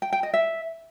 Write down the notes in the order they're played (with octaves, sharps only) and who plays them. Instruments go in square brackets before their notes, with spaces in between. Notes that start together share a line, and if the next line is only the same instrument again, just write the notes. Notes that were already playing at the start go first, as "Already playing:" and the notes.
[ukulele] G5
G5
D#5
E5